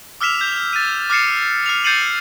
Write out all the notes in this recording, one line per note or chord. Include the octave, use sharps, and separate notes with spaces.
D6 E6 F6 B6 E7 F7
G6 B6
A6 D#7
D6 F6 A6 C7 C#7 E7
F6 C7 F7
G6 A6 C7 C#7 D#7 F#7